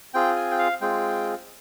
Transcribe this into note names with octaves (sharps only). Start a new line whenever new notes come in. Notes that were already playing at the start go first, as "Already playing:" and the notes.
C4 F4 G#4 G5
G#5
G5
F5
G#3 C4 F4 G#4 G5